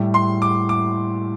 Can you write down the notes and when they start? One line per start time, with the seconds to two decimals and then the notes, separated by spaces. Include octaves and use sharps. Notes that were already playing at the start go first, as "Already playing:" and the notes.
Already playing: A2 G3 E4
0.14 C6
0.42 D6
0.69 D6